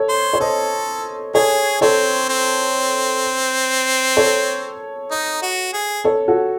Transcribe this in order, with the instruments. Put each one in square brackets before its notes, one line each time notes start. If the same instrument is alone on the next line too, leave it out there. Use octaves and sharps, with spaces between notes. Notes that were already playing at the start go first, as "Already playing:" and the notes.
Already playing: [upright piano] A4 C#5
[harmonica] C5
[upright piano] C#5
[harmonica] A4 [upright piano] C5 D#5
[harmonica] G#4 [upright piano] A4 C#5
[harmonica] C4 [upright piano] A4 C#5
[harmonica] C4
[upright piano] A4 C#5
[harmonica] D#4
F#4
G#4
[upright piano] A4 C#5
F#4 A4